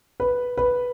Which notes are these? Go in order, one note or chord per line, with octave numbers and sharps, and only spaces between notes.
B4
B4